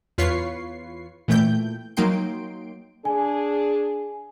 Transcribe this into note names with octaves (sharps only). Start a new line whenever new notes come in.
E2 F4 B4 C#5 C#6 C7
A#2 E3 A3 G5 G6
F#3 A#3 D#4 G5 C6 D7
D4 G#4 G#5